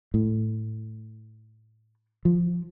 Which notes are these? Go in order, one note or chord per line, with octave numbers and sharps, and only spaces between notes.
A2
F3